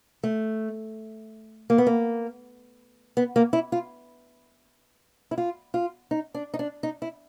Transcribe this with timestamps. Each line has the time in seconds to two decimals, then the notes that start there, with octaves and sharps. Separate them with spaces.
0.23 A3
1.70 A#3
1.78 B3
1.87 A#3
3.17 B3
3.36 A#3
3.53 E4
3.72 F4
5.31 E4
5.38 F4
5.74 F4
6.11 D#4
6.34 D4
6.54 D#4
6.59 D4
6.83 D#4
7.02 E4